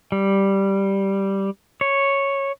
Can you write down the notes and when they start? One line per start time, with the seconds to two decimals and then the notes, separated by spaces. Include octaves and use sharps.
0.12 G3
1.81 C#5